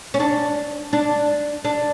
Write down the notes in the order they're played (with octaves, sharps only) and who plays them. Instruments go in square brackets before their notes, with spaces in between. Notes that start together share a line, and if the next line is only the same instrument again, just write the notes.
[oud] C#4
D4
D4
D4